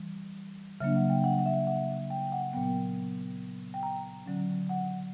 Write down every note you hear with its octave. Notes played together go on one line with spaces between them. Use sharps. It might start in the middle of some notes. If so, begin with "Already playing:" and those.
Already playing: E3 G3
C#3 F#3 A#3 D4 E5
F#5
G5
F#5
F#5
E5
F#5
G5
F#5
A#2 F#3 B3 G5
G5
A#5
D3 F#3 C#4
F#5